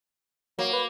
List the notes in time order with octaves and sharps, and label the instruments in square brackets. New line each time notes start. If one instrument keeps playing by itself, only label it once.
[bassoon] F#3 [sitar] A#3
[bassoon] B4